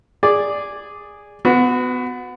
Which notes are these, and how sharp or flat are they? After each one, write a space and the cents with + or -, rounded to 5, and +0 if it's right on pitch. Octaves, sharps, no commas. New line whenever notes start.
G#4 -10 D5 +0
B3 +25 F#4 -15